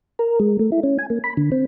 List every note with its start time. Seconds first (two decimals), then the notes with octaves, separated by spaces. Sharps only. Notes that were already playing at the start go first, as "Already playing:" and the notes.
0.19 A#4
0.40 G#3
0.59 A3
0.72 E4
0.83 C#4
0.99 G#5
1.10 A#3
1.24 B5
1.37 D3
1.52 C4